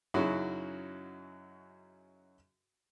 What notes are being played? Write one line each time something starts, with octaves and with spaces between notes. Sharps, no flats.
F#2 C#3 F#3 D#4 E4 F#4